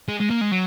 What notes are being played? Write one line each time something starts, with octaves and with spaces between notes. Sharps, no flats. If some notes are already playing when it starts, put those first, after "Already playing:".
G#3
G#3
A#3
G#3
F#3